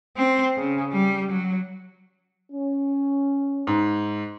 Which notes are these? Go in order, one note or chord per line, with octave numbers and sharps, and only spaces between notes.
C4
C#3
G3
F#3
C#4
G#2